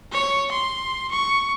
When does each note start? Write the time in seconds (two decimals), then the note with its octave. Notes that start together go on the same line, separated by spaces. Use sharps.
0.12 C#5
0.52 C6
1.12 C#6